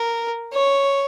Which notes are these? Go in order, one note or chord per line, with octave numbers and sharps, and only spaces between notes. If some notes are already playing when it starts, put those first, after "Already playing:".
Already playing: A#4
C#5